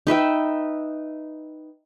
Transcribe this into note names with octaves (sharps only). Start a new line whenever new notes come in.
D#4 B4 E5 G5